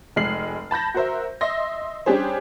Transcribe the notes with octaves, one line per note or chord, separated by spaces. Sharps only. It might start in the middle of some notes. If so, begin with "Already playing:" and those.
F1 G#3 F6 C7 F#7
A5 B5 G6 A#6
F#4 A#4 C5 E5
D#5 E5 C6 A#6
G3 C#4 D4 G4 G#4 C5